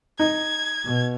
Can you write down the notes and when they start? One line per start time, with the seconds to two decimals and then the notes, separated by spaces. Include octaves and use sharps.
0.19 D#4 G#6
0.85 B2